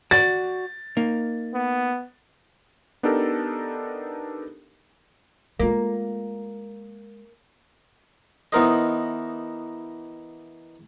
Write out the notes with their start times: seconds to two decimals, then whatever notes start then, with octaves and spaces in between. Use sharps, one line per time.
0.11 F#4 D5 A6
0.97 A#3 D#4
1.54 B3
3.03 B3 D4 D#4 G4 A4 A#4
5.59 G#3 A#3 F4
8.52 E3 B3 D#4 A#4 C5 D#5